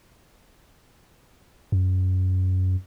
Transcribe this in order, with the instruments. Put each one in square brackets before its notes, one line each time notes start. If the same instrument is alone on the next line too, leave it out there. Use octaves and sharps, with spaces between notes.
[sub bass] F#2